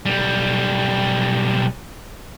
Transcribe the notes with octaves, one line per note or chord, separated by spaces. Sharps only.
B1 G3